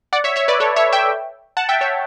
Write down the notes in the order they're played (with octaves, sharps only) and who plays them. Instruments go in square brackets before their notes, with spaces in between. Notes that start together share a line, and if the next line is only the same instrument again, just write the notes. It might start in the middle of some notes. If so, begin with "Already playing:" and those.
[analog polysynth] D5 F#5
C#5 E5
C#5 E5
B4 D5
A4 C#5
C#5 E5
E5 G5
F#5 A5
E5 G5
C#5 E5